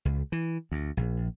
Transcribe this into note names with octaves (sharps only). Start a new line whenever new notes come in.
C#2
E3
D2
A#1